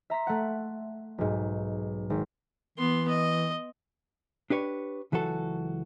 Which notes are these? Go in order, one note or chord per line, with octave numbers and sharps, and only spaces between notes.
E5 A#5 C6 B6
A3 F#5
B1 G#2
G#1
E3 B3 C6
D#5
D4 G4 B4 C#5
C#2 E3 F#3 F#4 A4